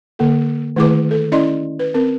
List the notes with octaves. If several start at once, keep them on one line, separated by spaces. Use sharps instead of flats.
D3 A#3 A4
D#3 A3 E4 G#4 B4 D6
A4
C#4 E4 D5 D#5 C6
B4
C4 A#4